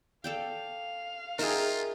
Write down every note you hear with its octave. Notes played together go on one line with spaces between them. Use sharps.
A4 D5 F5 G5
D#4 F4 G#4 A#4 E5 G5